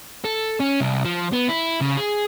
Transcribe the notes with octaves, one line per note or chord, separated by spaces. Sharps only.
A4
C#4
C2
F3
B3
E4
C#3
G#4